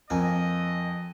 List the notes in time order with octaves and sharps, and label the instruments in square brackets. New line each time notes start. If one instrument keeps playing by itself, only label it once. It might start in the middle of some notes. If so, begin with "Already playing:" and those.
[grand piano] F2 G#5 [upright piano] F3 [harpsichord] A#3 [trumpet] D#5